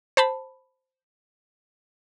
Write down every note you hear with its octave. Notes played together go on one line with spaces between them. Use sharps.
C5 A5 B5